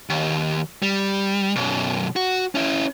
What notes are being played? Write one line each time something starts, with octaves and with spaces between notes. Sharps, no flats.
D#2
G3
B1 F#2
F#4
C#4 E4